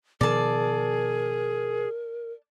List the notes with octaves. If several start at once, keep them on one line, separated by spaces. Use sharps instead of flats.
B2 D#3 F3 G#4 A#4 D5 A5